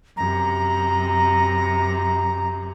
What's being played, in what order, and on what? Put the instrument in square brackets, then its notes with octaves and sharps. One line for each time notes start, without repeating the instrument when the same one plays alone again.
[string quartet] F#2 C3 [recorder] A#5